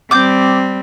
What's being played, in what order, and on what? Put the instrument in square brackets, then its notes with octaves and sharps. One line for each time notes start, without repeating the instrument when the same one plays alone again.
[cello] G3 C4 [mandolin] D6 G6